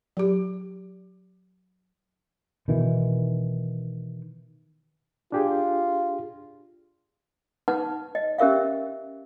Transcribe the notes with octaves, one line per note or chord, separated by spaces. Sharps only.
F#3 G4
B2 D#3 E3
D4 F4 G4 G#4
D#4 B4 F#5 A5
D#5
C#4 G4 A#4 E5 F5